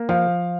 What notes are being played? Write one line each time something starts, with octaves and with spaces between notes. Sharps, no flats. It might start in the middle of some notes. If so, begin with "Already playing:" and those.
Already playing: A#3
F3 F5